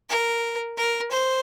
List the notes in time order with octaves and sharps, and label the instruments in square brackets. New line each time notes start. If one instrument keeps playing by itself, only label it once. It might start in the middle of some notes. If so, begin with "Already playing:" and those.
[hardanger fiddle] A#4
A#4
C5